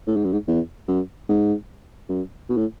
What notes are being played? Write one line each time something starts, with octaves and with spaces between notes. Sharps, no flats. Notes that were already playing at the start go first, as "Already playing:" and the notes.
A2
G#2
F#2
G#2
E2
F#2
G#2
F#2
B2
A2